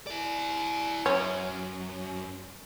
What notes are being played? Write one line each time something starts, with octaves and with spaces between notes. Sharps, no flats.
E4 D5
F#2 C#4